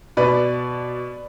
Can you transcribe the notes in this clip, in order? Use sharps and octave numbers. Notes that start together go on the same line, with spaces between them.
B2 B4 D5